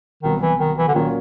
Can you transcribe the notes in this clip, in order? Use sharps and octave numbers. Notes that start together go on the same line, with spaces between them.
C2 B2 D#3 F#3 B3
E3
D#3
E3
D3
A#2 D#3 F#3 A#3 C#4 F4